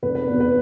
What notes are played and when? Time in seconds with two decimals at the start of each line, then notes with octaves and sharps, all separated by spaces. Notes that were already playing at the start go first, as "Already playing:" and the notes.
0.03 F1 B4
0.15 B4
0.27 E2 B2 B4
0.40 B4